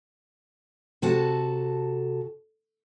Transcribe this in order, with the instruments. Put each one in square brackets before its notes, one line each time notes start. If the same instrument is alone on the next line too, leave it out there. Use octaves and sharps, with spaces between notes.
[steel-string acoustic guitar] C3 F#4 A4 A5